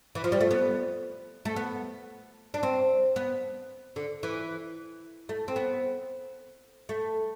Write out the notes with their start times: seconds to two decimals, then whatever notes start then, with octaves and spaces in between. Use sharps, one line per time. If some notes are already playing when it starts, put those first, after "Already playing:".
0.15 E3
0.24 F3
0.32 G3
0.41 A3
0.51 B3
1.45 A3
1.56 B3
2.54 D4
2.63 C4
3.16 B3
3.96 D3
4.23 E3
5.29 A3
5.48 C4
5.56 B3
6.89 A3